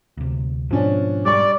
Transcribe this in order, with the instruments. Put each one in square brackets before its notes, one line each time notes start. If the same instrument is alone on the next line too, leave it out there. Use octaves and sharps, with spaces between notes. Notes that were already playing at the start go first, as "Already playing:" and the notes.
[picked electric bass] D2 C3
[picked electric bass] G#2 B2 [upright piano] F3 C#4 D4
[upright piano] G3 C#6 [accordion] D5